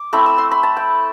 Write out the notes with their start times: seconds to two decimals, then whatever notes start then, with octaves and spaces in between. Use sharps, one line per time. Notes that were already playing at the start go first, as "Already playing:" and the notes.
Already playing: D6
0.13 A3 C4 E4 B5
0.26 E6
0.38 C6
0.51 B5
0.63 A5
0.77 G5